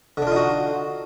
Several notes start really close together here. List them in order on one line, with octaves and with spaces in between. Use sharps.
D3 D4 F4 D#4 F#4